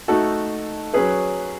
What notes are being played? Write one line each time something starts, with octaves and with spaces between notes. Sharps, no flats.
A3 D#4 F#4 A4
F#3 C#4 G#4 B4